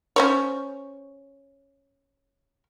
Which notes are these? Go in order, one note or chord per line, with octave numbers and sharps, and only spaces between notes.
C#4 C5 C#5